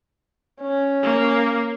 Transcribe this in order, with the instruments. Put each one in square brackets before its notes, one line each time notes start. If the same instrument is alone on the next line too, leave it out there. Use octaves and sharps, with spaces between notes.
[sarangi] C#4
[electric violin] A#3